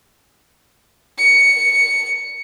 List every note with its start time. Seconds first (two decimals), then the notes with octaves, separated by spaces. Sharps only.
1.18 C#7